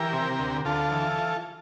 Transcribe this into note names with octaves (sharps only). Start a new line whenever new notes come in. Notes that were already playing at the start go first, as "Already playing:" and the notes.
Already playing: E3 G4 A#4
C3
D2
D2 F4 A4
E3